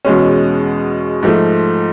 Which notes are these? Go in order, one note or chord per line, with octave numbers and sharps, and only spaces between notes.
E2 B2 G#3 C#4
G#2 F3 A3